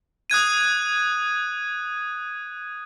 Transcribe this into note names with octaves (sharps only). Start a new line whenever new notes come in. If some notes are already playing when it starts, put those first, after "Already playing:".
D#6 F#6 G#6 D#7